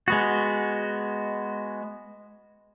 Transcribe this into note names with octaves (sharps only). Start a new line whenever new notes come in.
G#3 B3 F#4